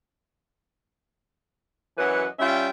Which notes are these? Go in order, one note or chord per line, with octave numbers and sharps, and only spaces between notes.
F#2 E3 F#3 B4 D#5 F#5
G3 C#4 F4 E5 G5